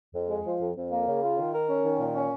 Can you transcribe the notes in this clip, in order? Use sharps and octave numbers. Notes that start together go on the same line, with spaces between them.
F2
G#3
F3
F2
F2
A#3
C#3
F4
D#3
A#4
C#4
D#3
A#2
C#4